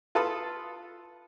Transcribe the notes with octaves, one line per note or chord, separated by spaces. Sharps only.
F4 A4 B4 A5 D#6